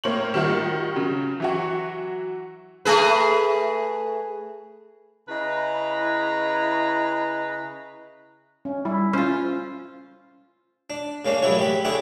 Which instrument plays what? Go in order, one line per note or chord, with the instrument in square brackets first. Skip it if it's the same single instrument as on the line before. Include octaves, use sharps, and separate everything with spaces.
[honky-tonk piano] A2 A#3 C5 C#5 F#7
D#3 G3 F4 F#4
C#3 F#3
E3 F#3 F#4
[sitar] A3 G#4 B4
[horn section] C#3 E4 B4 D#5 A#5
[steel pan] C#4
[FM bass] G3 [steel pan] E4
[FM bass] C#4 [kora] F4 C5
[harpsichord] D4
C#3 A#3 C#4 D4
A1 C#3 F#3 E4 F#4 C#5
G4 B5
D3 E4 G#4 C#5 F#5 D6